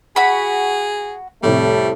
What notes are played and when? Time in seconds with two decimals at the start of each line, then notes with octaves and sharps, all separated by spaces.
0.16 F#4 G#4 B5
1.43 F2 A2 C3 G3 A3